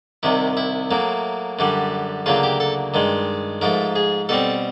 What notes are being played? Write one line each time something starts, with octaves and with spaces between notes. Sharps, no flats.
C2 C3 D#3 E4
E4
A2 F#3 A#3
F#2 D3 G3
D2 C#3 F#3 A#3 F4
G4
A4
G2 D#3 G#3
G#2 F3 A3 A#4
G#4
B2 G3 C4 A4